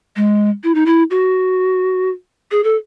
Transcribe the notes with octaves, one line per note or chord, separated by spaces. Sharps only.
G#3
E4
D#4
E4
F#4
G#4
A4